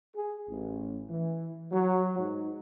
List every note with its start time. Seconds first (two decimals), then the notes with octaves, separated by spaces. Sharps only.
0.16 G#4
0.48 A1
1.09 E3
1.72 F#3
2.18 G#2